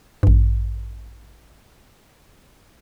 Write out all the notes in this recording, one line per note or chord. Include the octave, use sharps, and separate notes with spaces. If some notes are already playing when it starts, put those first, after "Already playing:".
A1 G2